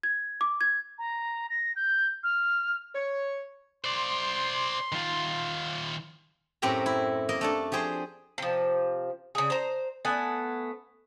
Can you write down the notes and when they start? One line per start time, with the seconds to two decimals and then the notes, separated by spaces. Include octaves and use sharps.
0.03 G#6
0.41 D6
0.61 G#6
0.99 A#5
1.50 A#6
1.76 G6
2.24 F6
2.94 C#5
3.85 C5 D5 C6
4.92 D#3 F4
6.62 F#2 A2 C4 G4 A#4 A#5
6.86 E4
7.29 A#3 A#4 D#5
7.41 A3 D4 A4
7.72 F3 G4 G#4 C5
8.38 C3 F3
9.35 C#3 G#4
9.50 C5 A#5
10.05 A3 B3 F#5 G#5